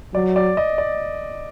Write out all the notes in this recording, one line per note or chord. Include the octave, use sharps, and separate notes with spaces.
F#3 D5
D5
D#5
D5